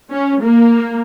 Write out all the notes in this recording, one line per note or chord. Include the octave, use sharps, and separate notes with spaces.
C#4
A#3